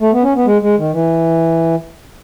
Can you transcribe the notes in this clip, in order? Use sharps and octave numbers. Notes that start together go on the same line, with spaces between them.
A3
B3
C#4
B3
G#3
G#3
D#3
E3